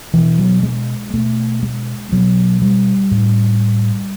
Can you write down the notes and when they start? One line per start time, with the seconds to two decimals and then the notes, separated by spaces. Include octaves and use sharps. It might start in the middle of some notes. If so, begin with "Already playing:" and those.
0.14 B2 E3
0.38 F#3
0.63 G#3
1.14 B2 A3
1.63 G#3
2.12 B2 F#3
2.62 G3
3.11 A2